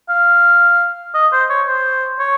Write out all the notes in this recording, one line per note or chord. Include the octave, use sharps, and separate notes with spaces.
F5
D#5
C5
C#5
C5
C#5